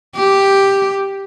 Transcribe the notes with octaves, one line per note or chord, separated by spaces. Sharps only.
G4